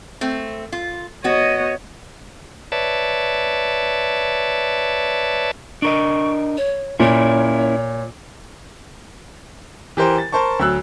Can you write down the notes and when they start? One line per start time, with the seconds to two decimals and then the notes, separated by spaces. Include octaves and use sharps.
0.21 A3 C4
0.72 F4
1.24 B3 F#4 C#5 D#5
2.72 B4 C#5 D5 E5 A5
5.82 D4 A#4 D#5 C#6
6.57 C#5
7.00 A#2 A#3 C#4 E4 C#5
9.97 E3 G4 A#4 C5
10.18 A6
10.32 A#4 C5 A5 C#6
10.59 D2 F#3 E6 F#6